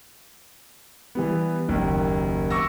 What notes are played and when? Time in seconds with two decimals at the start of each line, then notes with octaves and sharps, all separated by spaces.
1.15 E3 G3 B3
1.68 F#1 D#2
2.50 C#6 D6 E6 A#6